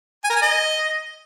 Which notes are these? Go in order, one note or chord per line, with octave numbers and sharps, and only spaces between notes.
G#5
A#4
G#5
D#5